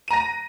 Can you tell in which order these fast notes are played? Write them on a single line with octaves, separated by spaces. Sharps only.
D#7 A#5 A#6